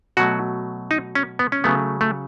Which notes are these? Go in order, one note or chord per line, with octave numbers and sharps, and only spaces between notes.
B2 F#3 A3 F#4
D#4
C#4
B3
C#4
C#3 F#3 A3 B3
A3